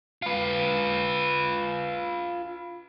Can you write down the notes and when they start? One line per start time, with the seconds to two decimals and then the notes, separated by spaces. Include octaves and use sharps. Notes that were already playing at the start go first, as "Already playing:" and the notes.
0.22 F4 B4